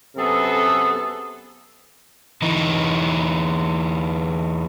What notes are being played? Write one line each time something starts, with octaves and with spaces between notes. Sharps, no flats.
F#2 C3 B3 G#4 A4
E2 E3 D#4